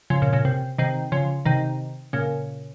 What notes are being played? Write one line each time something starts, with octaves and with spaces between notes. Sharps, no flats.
C#3 F3
A#2 C#3
A#2 C#3
C3
C3 D#3
C#3 F3
C3 D#3
A#2 C#3